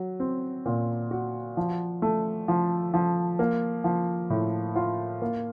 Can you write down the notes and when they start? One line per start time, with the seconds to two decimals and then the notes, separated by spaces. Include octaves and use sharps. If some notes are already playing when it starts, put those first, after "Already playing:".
Already playing: F#3
0.20 C4
0.66 A#2
1.11 F#4
1.57 F3
2.02 A3
2.48 F3
2.94 F3
3.39 A#3
3.84 F3
4.30 A2
4.75 F4
5.22 A#3